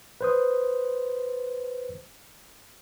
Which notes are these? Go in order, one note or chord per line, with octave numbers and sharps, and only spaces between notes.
B4 C5 D#6